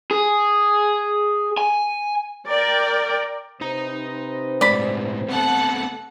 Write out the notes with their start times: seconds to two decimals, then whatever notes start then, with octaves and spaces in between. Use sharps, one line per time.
0.11 G#4
1.57 G#5
2.47 A#4 D5 G5
3.61 C3 D#4 B4 C5 A#5
4.61 A2 G#3 D5 B5
5.29 A3 B3 C4 A4 F#5